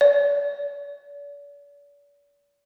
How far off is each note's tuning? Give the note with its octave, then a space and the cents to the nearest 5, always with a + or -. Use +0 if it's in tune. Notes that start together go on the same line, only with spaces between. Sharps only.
D5 -45